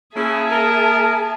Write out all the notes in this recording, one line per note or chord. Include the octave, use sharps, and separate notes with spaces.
C#3 A#3 E4 G#4 E5 A5
A4 A#4